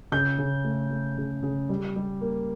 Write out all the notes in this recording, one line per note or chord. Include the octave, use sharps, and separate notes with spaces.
C#3 G6
C#3
A3
A3
C#3
C#3
G3
G3
A#3